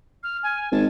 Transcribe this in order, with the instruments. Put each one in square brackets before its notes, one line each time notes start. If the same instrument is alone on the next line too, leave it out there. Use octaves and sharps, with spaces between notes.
[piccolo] F6
G#5
[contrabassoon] G#1 [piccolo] A5